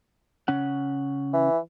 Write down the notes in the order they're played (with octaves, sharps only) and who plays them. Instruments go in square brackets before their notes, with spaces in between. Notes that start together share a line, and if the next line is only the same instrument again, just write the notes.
[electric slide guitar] C#3 C#4 F#5
[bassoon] E3